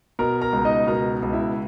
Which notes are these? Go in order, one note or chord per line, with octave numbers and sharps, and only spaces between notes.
B2 A#4 A#5
A#4 A#5
C#2
D#4 D#5
B2 A#4 A#5
C#2
E4 E5